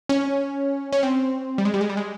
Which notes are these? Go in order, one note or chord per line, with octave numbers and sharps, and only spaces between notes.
C#4
C#4
C4
G3
G#3
G3
G#3
G3
G#3